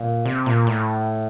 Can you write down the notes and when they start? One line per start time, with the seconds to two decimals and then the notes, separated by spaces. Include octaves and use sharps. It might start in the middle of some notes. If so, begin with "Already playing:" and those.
Already playing: A#2
0.26 C3
0.46 A#2
0.67 A2